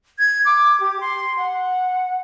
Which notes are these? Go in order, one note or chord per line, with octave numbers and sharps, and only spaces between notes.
G#6
D6
G4
C6
F#5